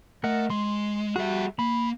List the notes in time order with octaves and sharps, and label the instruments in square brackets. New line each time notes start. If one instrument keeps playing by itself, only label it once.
[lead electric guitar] A3 [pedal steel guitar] A#4 D#5 F#5
[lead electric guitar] G#3 [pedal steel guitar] C6
[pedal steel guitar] G3 F#4 [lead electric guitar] G#4 E5
[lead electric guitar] A#3 [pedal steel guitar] B5